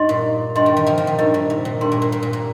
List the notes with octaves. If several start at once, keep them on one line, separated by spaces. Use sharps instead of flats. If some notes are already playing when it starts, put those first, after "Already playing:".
Already playing: G2 D#4 G4 D#5 C6
A#2
G2 G4 D#5 C6
D#3
D#3
C3 F3
D#3
A#2
G2 D#4 G4 A#4 D#5
A#2
C3
A#2
G2 G4 A#4 G5 C6
A#2
A#2
A#2
A#2
A#2